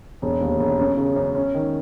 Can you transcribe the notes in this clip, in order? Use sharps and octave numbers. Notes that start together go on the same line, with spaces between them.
E1
D#2
E1
F#2
C#3
F#2
C#4
D#3